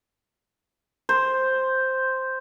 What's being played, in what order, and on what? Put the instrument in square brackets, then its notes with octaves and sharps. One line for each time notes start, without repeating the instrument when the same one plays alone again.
[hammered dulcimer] C5